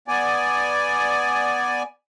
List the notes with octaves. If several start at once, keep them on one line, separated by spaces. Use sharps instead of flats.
B3 D5 G#5